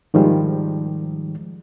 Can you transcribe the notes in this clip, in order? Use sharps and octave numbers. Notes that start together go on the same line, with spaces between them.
G#2 D#3 F3 G3 G#3